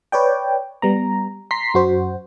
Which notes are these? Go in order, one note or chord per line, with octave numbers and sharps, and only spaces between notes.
B4 C#5 D5 G5
G3 B3 A#5
A#5 C6 B6 C7
F#2 F#4 C5